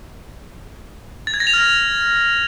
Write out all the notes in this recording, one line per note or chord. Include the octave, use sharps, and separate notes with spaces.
A6
G#6
A#6
F7
F6